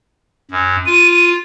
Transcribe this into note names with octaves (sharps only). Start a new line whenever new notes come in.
F#2
F4 D#7